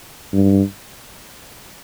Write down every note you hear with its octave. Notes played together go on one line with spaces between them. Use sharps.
G2